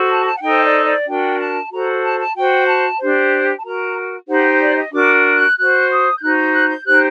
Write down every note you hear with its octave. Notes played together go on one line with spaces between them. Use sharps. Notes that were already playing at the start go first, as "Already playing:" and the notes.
Already playing: F#4 A4 C5
A5
A5
F#5
D#4 A4 C5 G5
D#5
D5
D5
D4 F#4 A#4 G5
A5
F#4 A4 C5 A#5
A5
A5
F#4 C5 G5
A5
D4 G4 C5
A5
F#4 A#4 A#5
D#4 G4 C5 F#5
D5
D#5
D4 F#4 A#4 D6
F#6
F#4 C5 F#6
D#6
G6
D#4 F#4 C5 F#6
G6
F#6
G6
D#4 G4 C5 F#6